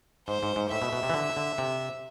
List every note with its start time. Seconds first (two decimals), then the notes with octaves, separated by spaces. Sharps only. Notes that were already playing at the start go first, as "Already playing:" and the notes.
0.28 G#2 C5
0.43 G#2
0.56 G#2
0.71 A2 E5
0.82 B2
0.93 B2
1.03 C3
1.10 E3
1.14 D3
1.37 D3
1.58 C3